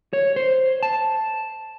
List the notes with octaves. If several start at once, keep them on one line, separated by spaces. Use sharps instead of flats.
C#5
C5
A5